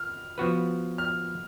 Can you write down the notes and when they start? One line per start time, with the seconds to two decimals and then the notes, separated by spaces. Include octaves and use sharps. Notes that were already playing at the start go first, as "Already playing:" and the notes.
Already playing: F6
0.38 F3 B3 F#4 B4
0.98 F6